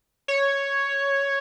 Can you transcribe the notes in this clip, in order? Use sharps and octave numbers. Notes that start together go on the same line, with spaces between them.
C#5